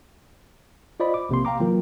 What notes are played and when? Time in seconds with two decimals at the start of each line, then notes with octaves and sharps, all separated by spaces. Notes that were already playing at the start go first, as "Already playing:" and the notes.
1.00 F4 C5 D5 D#5 B5
1.14 D6
1.29 A#1 C3 A#3 C6
1.45 F5 G5 A#5 D6
1.60 E3 F#3 A#3 F4 A#4